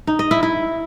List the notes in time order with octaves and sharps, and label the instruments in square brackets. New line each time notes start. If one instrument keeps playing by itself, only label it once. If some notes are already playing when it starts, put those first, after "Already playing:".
[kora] D#4
D#5
E4
E4